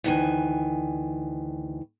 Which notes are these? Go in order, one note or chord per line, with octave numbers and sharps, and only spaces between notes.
D2 D#3 E3 G#5